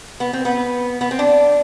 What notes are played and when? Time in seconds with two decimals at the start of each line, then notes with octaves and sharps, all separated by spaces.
0.20 B3
0.33 C4
0.45 B3
1.01 B3
1.11 C4
1.19 D4